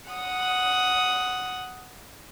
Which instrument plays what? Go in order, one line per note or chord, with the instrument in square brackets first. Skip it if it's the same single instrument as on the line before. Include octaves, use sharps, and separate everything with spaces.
[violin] F#5 D#6